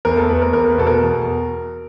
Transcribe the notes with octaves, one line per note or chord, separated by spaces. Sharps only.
E2 A#4
A4
E2 B4
A#4
E2 A#4
B4
B2 A4
A#4
E2